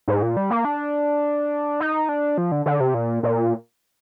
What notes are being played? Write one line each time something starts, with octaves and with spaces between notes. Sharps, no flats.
G#2
A#2
G3
A#3
D4
D#4
D4
F3
D3
D3
C3
A#2
A#2